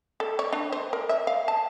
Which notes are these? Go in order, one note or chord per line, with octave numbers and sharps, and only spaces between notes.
A4
C#5
D4
C5
A#4
E5
F5
A5